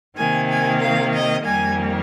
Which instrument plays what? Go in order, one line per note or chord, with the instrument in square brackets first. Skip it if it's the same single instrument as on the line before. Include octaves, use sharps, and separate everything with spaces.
[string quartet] C3 D#3 A#3 G#5
G#5
F5
D#5
F2 D#3 G3 A#3 G#5